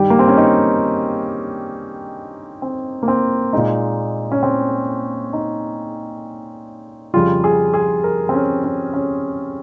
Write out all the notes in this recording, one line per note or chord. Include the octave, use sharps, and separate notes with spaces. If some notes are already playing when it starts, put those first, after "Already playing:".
Already playing: G2 D#3 G3 G4
A#3
C4
C#4
D#4
C4
A#3
C4
A#2 G#3 D#4
C#4
C4
D#4
F2 C#3 G3 F4
G#4
G#4
A#4
C4
C#4
C#4
C#4